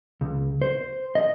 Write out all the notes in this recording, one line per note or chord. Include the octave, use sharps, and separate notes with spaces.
C#2
C5
D#5